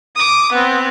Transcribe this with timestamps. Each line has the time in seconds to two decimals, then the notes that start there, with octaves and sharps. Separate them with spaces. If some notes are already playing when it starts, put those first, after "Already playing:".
0.16 D6 D#6
0.52 B3 C4